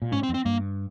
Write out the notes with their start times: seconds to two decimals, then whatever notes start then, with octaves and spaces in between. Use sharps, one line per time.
0.02 A#2
0.12 G#2 C#4
0.23 C4
0.29 F2
0.34 C4
0.46 G2 A#3